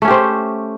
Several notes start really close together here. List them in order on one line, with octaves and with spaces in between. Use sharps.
A3 C#4 G4 C5